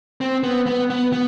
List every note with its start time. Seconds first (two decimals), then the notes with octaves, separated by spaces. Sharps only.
0.21 C4
0.43 B3
0.66 B3
0.90 B3
1.13 B3